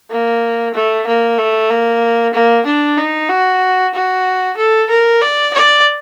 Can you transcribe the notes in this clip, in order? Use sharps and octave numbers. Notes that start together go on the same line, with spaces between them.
A#3
A3
A#3
A3
A#3
A#3
D4
D#4
F#4
F#4
A4
A#4
D5
D5